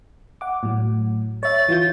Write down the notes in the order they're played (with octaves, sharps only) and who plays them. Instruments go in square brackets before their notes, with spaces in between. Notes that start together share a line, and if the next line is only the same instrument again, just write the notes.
[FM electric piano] F#5 D6
A2 F#3
[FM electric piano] C#5 E5 [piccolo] A6
[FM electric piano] E3 F4 G6